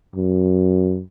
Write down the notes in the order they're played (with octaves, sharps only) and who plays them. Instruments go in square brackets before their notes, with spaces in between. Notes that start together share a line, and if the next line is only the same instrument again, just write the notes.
[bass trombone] F#2